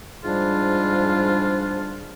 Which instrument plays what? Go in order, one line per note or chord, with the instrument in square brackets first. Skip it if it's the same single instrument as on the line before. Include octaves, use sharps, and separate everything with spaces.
[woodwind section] G#2 F3 G3 D4 F4